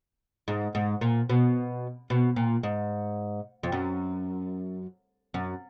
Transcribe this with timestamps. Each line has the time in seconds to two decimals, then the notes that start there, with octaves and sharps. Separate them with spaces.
0.48 G#2
0.75 G#2
1.01 A#2
1.29 B2
2.10 B2
2.36 A#2
2.63 G#2
3.63 F2
3.72 F#2
5.34 F#2